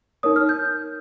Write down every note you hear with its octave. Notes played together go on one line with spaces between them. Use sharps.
D#4 A#4 C#5 D#6
F6
G6